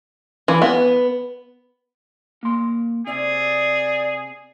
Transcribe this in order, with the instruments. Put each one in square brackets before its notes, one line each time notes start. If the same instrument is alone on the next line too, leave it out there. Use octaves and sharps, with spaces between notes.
[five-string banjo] E3
B3
[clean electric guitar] A#3 C6
[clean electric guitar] C3 [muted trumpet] G#4 [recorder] D5